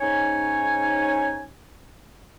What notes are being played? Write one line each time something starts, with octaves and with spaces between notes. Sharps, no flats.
G#2 C#4 D#4 C#5 G#5